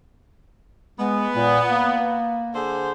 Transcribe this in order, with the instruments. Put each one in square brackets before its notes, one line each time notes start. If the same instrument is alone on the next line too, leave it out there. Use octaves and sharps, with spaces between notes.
[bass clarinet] G#3 [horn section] B3
[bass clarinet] A#2
A#3
[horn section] D3 G#4 C5